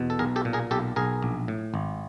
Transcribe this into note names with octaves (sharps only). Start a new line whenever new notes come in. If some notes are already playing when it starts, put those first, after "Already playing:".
Already playing: E2 B2
A4
B1 G#4 A#4
G4 A4
A#2
G#4 A#4
B1 G4 A4
B1 G#4 A#4
A#1
A2
G#1